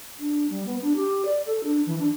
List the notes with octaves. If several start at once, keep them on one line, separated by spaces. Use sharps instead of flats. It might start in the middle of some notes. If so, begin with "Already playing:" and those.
D4
G3
B3
D4
G4
D5
A4
D4
E3
D4